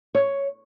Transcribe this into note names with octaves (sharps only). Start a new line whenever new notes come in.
C#5